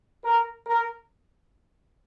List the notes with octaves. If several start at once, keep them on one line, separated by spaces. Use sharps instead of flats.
A#4
A#4